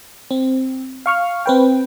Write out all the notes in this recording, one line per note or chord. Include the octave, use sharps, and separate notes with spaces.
C4
F5 C#6 F6
C4 B4 G5